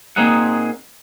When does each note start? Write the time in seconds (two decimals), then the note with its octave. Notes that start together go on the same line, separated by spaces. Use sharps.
0.16 A#2 A#3 C4 D#4 G#4 F#5